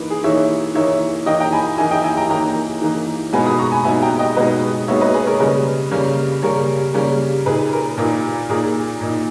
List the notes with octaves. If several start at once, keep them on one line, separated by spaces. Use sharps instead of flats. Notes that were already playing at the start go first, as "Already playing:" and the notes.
Already playing: E3 A#3 D#4 B4
G#4
E3 A#3 D#4 C#5 E5
E3 A#3 D#4 C#5 E5
E3 A#3 D#4 D#5 G5
G5 A#5
G#5 B5
E3 A#3 D#4 E5 G#5
D#5 G5
E5 G#5
G5 A#5
E3 A#3 D#4 G5 A#5
E3 A#3 D#4
B2 G#3 B3 D#4 G#5 B5
B5 D#6
A#5 C#6
G#5 B5
B2 G#3 B3 D#4 E5 G#5
G5 A#5
D#5 G5
B2 G#3 B3 D#4 B4 D#5
B2 G#3 B3 D#4 C#5 E5
B4 D#5
G#4 B4
A#4 C#5
C#3 G3 A#3 C#4 B4 D#5
C#3 G3 A#3 C#4
C#3 G3 A#3 C#4 A#4 C#5
C#3 G3 A#3 C#4
A#2 A#3 D#4 G#4 B4
A#4
A#2 A#3 D#4 A#4
A#2 A#3 D#4 G#4
A#2 A#3 D#4